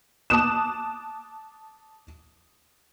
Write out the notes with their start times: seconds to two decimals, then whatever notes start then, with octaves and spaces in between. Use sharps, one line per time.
0.30 A5 D6 D#6 F#6 E7